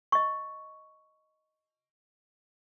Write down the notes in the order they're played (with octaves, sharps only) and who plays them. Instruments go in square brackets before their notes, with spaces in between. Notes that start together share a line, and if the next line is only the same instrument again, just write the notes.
[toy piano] D#5 C#6